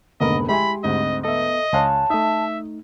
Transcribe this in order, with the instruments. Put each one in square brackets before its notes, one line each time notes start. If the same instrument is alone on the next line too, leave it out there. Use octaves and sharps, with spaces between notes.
[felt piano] F1 G#2 D3 [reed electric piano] A#3 B3 A#4 [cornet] D#5 [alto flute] B5
[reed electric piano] G#3 G4 C6 [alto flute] E4 [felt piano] E5 G#5 [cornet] B5
[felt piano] D2 G#2 [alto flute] C4 [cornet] D#5
[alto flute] B3 [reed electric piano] A4 E5 [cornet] D#5
[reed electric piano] C#2 G#5 F#6 [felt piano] C#5 F5 C6 [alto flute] A5
[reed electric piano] A3 D#4 [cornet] E5 [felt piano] D#6